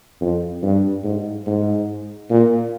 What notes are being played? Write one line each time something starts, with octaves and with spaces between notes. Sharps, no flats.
F2
G2
G#2
G#2
A#2